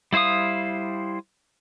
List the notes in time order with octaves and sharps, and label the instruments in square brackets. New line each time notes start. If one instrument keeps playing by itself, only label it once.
[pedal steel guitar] G3 E4 C5 F5 D#6